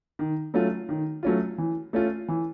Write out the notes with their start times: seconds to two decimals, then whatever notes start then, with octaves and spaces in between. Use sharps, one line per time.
0.19 D#3
0.54 F#3 A3 C#4 F4
0.89 D#3
1.23 F#3 A3 C#4 F4
1.58 E3
1.93 A3 C#4 F4
2.28 E3